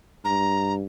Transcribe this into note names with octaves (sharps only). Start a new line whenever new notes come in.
G2 A#5